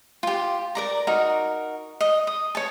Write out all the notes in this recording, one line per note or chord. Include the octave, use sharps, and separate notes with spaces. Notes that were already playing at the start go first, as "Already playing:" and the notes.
F4 G4
A#4 D5 A#5
D#4 F#4 A#4
D#5
D#6
C#5 A5